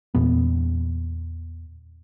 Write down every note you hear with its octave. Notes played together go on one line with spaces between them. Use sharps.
E2 A#2 B3